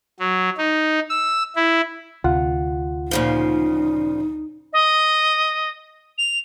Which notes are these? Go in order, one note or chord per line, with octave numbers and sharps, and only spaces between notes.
F#3
D#4
E6
E4
D2 C3 F4 F#5
A#2 C#3 F3 D#4
D#5
F7